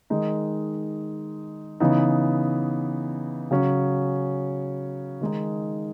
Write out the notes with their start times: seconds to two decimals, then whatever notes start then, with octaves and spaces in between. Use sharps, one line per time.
0.10 D#3 G#3 D#4
1.80 C#3 E3 B3 D#4
3.51 C#3 F#3 C#4
5.21 D#3 G#3 D#4